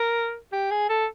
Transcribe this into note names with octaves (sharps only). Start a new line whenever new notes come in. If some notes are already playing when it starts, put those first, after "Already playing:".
Already playing: A#4
G4
G#4
A4